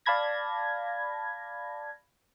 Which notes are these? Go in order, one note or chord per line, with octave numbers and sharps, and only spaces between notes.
D5 F5 A5 B5 G#6 A#6